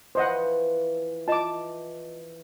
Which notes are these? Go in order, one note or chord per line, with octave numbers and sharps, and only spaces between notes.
E3 F3 C5 D#5 F#5 C#6
F4 D#5 A5 D6